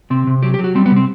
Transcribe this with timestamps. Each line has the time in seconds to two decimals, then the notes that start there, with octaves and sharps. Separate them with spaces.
0.10 C3 C4
0.27 C3
0.43 F#3 G4
0.54 G4
0.59 F#3
0.64 F#4
0.75 G3 C4
0.86 B3
0.91 C3
0.96 C4